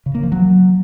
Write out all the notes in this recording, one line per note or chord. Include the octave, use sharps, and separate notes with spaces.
C#3
A#3
F3
F#3